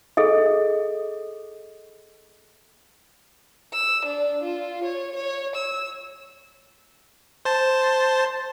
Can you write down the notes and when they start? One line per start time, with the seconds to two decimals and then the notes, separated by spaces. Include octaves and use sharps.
0.17 G#4 A4 D#5
3.74 E6
4.05 D4
4.43 F4
4.84 C#5
5.16 C#5
5.56 E6
7.45 C5 A5